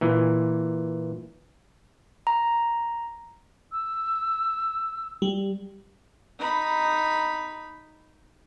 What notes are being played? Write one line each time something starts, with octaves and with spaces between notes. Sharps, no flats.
A#2 E3
A#5
E6
G3
D#4 B5